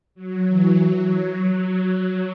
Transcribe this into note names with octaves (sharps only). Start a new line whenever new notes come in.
F#3
E3
F#3